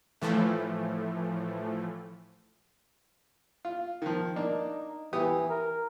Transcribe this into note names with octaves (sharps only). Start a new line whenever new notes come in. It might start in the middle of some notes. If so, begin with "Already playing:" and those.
A2 E3 F3 A3
F4
D#3 F3
A#3 D4 D#4
E3 B3 G4 D#6
A#4